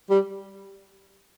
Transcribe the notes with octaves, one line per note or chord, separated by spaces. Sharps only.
G3